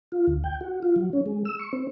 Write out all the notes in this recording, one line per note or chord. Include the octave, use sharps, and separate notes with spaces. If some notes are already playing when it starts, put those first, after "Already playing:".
F4
D2
G5
F#4
F4
F#3
C#4
G#3
E6
C#6
C4